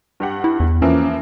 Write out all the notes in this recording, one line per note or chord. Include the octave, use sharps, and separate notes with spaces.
G2 G4 F#5
E4
E2
E3 F3 A#3 C#4